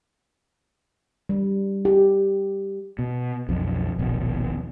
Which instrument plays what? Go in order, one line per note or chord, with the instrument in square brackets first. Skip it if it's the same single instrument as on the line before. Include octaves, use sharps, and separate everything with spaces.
[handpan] G3
G4
[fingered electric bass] B2
B1 F2
D#1 A#1 B2